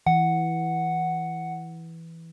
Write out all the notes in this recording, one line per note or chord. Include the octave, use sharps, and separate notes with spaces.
E3 F#5